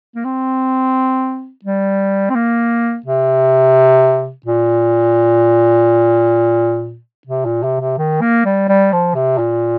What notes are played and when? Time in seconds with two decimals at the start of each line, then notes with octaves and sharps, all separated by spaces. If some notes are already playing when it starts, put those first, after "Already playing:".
0.16 A#3
0.25 C4
1.65 G3
2.30 C4
2.35 A#3
3.06 C3
4.46 A#2
7.27 C3
7.46 A#2
7.63 C3
7.80 C3
7.98 D#3
8.21 A#3
8.45 G3
8.69 G3
8.92 F3
9.15 C3
9.38 A#2